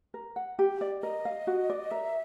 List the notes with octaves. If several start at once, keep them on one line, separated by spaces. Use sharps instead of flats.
A#4
F#5
G4
D5
A#4 D#5
F5
F#4
D5
A#4 E5